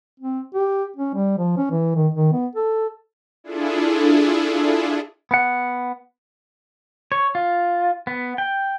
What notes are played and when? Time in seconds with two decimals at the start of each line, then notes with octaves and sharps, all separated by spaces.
0.20 C4
0.54 G4
0.96 C#4
1.15 G3
1.38 F3
1.57 C#4
1.71 E3
1.95 D#3
2.14 D#3
2.33 B3
2.55 A4
3.44 D4 E4 F4 G#4 A4
5.31 B3 F#5
7.12 C#5
7.35 F4
8.07 B3
8.38 G5